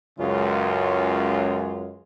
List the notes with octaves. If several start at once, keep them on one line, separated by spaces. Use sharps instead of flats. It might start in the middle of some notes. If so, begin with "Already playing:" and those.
C#2 F#2 C#3 G#3 F4